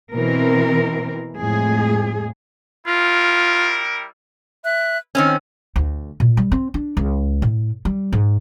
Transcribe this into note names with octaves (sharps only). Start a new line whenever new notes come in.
B2 E3 C4 A#4
F2 A2 G#3 G#4
G3 E4 F4 A#4
E5 F#6
D#3 C4 C#4 F6
D2
A#2
G3
C4
D4
C#2
A2
G3
G#2